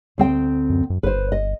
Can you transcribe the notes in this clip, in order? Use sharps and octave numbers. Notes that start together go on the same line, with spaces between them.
D2 C4 G5
F#2
F#2
G1 B4 C5
D#5